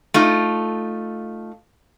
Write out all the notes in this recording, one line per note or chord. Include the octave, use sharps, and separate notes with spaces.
A3 D#4 F4